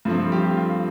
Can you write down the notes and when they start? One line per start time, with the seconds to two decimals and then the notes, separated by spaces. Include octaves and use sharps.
0.05 G2 F3 A3 C4 F4
0.32 G4
0.57 F4